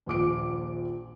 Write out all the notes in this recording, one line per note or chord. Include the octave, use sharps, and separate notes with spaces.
D#1 A#1 D6 D7